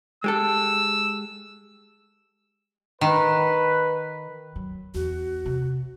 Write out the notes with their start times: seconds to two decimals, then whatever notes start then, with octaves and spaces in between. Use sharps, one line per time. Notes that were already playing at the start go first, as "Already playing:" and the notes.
0.24 G#3 G4 A4 E6
3.01 D#3 B4
4.56 F#3
4.94 E2 F#4
5.46 C3